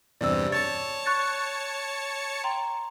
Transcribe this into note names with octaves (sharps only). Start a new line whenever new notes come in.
E2 G2 C3 D5 E6
C#5 A5 A6 C#7
C#6 F#6 A6
G5 A#5 C6